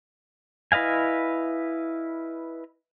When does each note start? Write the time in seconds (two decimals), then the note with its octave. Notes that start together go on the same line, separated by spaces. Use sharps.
0.72 E4 B4 D#5 F5 G#5